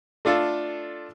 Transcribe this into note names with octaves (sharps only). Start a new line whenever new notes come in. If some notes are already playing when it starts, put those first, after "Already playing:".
A3 D4 F4 A4